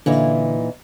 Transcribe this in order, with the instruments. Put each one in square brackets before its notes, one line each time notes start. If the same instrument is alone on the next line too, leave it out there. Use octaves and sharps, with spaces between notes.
[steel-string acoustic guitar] A#2 E3 D#4 [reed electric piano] D3